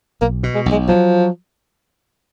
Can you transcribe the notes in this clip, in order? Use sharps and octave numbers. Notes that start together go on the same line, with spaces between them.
B1 A#3
B2
G#3
B1
G#3
F3 F#3